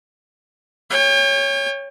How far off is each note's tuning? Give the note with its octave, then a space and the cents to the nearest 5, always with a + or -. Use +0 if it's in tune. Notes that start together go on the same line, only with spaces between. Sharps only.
C#5 +0 G5 +40